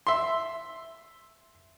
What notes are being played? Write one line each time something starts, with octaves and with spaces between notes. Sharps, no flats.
E5 C6